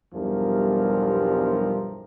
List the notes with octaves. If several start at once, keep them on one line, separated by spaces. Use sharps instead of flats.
B1 E2 G2 F3 G3 A#4